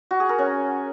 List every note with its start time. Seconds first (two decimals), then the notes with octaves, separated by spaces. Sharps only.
0.11 F#4
0.20 G#4
0.29 A#4
0.38 C#4